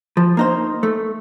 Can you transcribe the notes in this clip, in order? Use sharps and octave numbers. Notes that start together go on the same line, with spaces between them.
F3
A#3 D#4 C5
A3